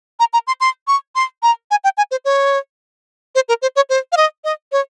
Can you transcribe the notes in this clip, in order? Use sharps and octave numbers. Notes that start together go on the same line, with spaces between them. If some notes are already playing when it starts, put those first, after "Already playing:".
A#5
A#5
C6
C6
C#6
C6
A#5
G#5
G5
G#5
C5
C#5
C5
A#4
C5
C#5
C5
F5
D#5
D#5
C#5